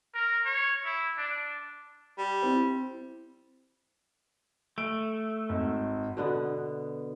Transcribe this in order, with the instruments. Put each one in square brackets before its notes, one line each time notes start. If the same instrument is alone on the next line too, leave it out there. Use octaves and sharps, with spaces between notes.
[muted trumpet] A#4
C#5
E4
D4
[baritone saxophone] G3
[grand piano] C4 E4
[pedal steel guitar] A3 [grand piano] D7
[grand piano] G#1
[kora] B2 D3 B3